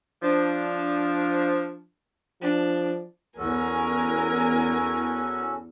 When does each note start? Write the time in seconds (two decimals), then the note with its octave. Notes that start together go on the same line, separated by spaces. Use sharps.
0.23 F3 D4
2.42 F3 D4
3.38 E2 C#4 F#4 A4 A#4 G#5